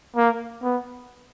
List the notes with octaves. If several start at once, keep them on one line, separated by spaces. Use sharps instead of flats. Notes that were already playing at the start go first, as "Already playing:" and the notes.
A#3
B3